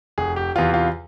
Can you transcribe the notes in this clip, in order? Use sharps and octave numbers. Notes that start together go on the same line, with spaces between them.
F1 G#4
G4
E2 C3 E3 F4
F4